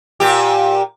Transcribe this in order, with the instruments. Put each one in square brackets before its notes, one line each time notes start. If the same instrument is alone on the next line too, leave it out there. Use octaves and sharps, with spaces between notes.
[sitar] A#2 G4